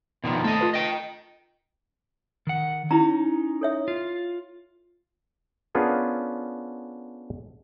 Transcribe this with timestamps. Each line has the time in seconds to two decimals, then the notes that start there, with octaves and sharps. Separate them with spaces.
0.24 B2 D#3 F3
0.44 A3 A4 D#5
0.61 F4 B4
0.74 D#5 G5
2.47 D#3 F#5
2.91 C#4 D#4 E4 G4 A#5
3.61 A4 C#5 E5
3.88 F4
5.75 B3 C#4 D4 F4 G#4 A#4